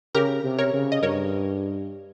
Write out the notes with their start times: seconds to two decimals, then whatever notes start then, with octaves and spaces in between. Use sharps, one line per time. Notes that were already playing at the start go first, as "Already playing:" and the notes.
0.14 C#3 G4 A#4
0.44 C3
0.58 A#4 C#5
0.73 C#3
0.92 D#5
1.02 G2 A#4 C#5